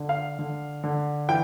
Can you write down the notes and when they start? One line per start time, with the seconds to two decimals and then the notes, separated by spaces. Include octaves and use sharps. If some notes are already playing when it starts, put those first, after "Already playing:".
Already playing: D3
0.09 F5
0.39 D3
0.84 D3
1.29 E3 G5